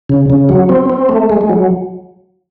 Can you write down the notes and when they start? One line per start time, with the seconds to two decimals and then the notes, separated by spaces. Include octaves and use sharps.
0.09 C#3
0.30 C#3
0.49 F#3
0.69 C4
0.90 C4
1.09 A3
1.30 G#3
1.41 G#3
1.49 F#3